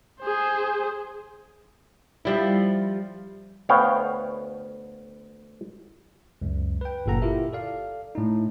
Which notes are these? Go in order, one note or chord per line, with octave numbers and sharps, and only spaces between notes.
G#4 C5
F3 G3 E4
D2 B3 C#5 F5 G5
C#2 F#2
B4 G5
G1 F#2 A#2 A4 F#5 A#5
E4 F4 G4 A#4 E5
A4 D5 F5
A2 D#4